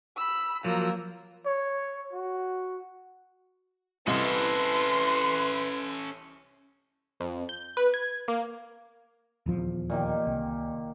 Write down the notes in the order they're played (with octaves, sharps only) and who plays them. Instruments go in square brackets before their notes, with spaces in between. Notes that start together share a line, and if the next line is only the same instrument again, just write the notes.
[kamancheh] B5 E6
[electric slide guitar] F3 F#3 [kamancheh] A#3 E6
[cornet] C#5
F#4
[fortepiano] C2 C3 D#5 [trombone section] E3 B4 [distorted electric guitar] C#4 A4 [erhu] C6
[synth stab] F2
G6
B4
G#6
A#3
[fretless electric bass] D#1 E2 F3
[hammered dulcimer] A#2 D#3 G4
[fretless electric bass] C2